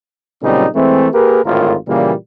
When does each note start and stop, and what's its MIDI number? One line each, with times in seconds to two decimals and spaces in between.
0.43 0.66 46
0.43 0.66 49
0.43 0.66 54
0.43 0.66 55
0.43 0.66 60
0.43 0.66 63
0.75 1.07 52
0.75 1.07 56
0.75 1.07 57
0.75 1.07 60
1.13 1.44 58
1.13 1.44 67
1.13 1.44 68
1.13 1.44 70
1.13 1.44 71
1.44 1.74 32
1.44 1.74 38
1.44 1.74 45
1.44 1.74 65
1.44 1.74 70
1.88 2.13 46
1.88 2.13 49
1.88 2.13 52
1.88 2.13 55
1.88 2.13 58